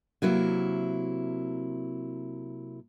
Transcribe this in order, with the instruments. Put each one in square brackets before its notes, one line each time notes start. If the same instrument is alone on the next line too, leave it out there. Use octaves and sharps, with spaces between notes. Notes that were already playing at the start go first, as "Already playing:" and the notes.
[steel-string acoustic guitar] C3 F#3 A#3 E4